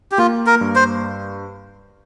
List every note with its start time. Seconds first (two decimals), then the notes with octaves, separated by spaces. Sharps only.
0.12 G4
0.18 A#3 F4
0.47 A#4
0.61 G2
0.75 C5